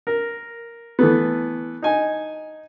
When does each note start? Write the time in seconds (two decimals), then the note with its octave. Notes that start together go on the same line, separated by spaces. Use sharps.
0.07 A#4
0.99 E3 A3 B3
1.82 D#4 G#5